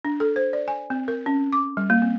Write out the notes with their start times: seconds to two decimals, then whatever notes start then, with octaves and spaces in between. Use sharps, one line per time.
0.05 D4
0.20 A4
0.36 C5
0.53 D5
0.68 G#5
0.90 C4
1.08 A#4
1.26 C#4
1.53 D6
1.77 G3
1.90 A#3
2.02 C4